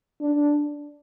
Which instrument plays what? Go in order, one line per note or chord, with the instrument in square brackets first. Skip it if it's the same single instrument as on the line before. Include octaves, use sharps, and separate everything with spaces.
[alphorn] D4